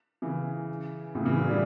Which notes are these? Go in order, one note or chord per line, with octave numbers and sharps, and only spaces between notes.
C#3 E3
A2 C#3
C#3 E3
D3 F#3
E3 G3